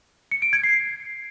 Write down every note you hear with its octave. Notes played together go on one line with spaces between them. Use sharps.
C#7
D7
G#6
C7